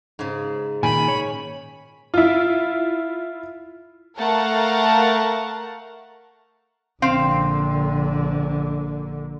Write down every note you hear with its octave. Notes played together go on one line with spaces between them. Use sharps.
G#2 C#3
A#2 D#3 G#5 B5
C#5
E4 F4
A3 A#4 F5 F#5 A5
A#1 D3 C4 F5